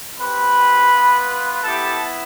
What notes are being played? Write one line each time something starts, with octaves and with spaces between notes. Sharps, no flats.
C4 G4 B4 B5
B3 F4
B3 E4 G4 A4 A5